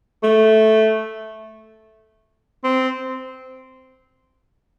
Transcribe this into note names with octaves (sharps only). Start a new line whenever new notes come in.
A3
C4